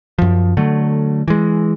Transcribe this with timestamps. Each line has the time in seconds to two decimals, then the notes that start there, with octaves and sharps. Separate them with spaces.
0.19 F#2 F3
0.57 D3 F#3 A3
1.28 E3 G#3